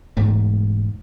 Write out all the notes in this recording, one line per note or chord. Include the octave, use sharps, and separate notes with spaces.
E1 G#2 A3